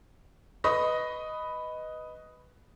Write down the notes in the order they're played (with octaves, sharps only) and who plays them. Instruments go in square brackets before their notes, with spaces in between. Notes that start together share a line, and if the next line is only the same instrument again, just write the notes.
[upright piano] B4 D#5 B5 C#6 D#6 A#6